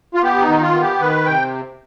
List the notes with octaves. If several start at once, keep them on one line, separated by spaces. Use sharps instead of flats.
F4
B3 G4
D#4
D#3
F4
B3
G4
D#3 B4
C3 G5